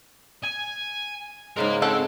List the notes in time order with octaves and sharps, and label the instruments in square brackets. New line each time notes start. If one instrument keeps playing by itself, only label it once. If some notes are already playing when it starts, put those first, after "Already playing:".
[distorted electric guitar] G#5
[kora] G#2 C#3 G#3 [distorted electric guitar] A#4 F5
[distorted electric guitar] C4 [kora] C#4 [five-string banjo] A4 F#5